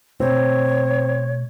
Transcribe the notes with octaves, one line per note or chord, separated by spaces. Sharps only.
B2 A3 C4 C#5